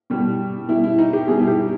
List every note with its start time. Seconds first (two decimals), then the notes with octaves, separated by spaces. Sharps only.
0.10 B2 G3
0.68 B2 G3 E4
0.84 E4
0.99 D#4
1.13 G4
1.28 B2 G3 G#4
1.39 E4
1.48 G4